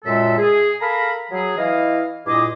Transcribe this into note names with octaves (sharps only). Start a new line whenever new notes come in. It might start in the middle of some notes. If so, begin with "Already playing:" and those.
F#2 A#2 G#3 A4 E5
G#4
A4 A#4 F5 A#5 B5
F#3 G#4
E3 E4 D#5 F5
G2 A#2 E4 G#4 D#5 D6